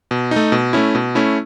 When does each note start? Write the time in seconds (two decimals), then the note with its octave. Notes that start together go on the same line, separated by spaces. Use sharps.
0.11 B2
0.31 A3 D#4
0.52 B2
0.73 A3 C#4 E4
0.95 B2
1.15 A3 C#4 E4